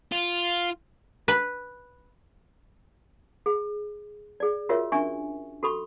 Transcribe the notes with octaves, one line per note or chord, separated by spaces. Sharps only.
F4
B4
G#4
G#4 D5
F4 F#4 A#4 C#5 E5
C#4 D4 E5 G#5 C#6
F#4 A4 B5 C#6